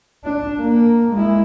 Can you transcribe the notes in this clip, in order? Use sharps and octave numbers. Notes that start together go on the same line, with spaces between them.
D4
A#3
G#3 E4